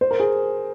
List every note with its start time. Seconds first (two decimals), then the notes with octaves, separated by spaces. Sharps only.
0.01 C5
0.11 A#4
0.20 G#4